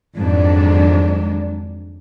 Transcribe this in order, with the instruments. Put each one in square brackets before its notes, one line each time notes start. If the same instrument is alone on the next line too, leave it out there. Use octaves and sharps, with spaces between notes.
[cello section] F2 G#2 D#3 F#3 G#3 D4